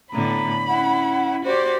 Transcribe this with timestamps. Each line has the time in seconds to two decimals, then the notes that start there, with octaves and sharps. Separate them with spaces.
0.13 A2 D3 B3 A#5 B5
0.68 C#4 E4 F#5
1.45 F#4 G4 C5 D5